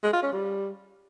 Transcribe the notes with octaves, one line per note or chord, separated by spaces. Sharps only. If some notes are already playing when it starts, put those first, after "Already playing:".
G#3
F4
C#4
G3